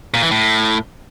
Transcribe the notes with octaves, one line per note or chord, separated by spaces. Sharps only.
A#2
E3
A2